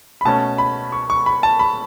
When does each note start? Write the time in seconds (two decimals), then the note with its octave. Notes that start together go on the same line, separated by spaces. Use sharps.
0.21 B5
0.25 B2 A3 C#4 A5
0.58 B5
0.92 C#6
1.10 C#6
1.26 B5
1.43 A5
1.59 B5